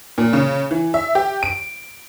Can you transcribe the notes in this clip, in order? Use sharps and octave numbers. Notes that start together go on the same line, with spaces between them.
A#2
C#3
E3
E5
G4
D7